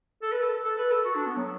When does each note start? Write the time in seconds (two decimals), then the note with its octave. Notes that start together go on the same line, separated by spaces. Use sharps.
0.22 A4
0.32 B4
0.42 A4
0.64 A4
0.78 B4
0.92 A4
1.05 F#4
1.16 D4
1.27 B3
1.36 F#3